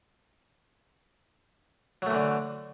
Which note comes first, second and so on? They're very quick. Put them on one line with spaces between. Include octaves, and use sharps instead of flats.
F#3 A3 E3 D3